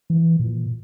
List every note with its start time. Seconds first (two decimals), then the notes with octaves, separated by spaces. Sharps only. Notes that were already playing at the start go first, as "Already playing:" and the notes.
0.10 E3
0.39 A#2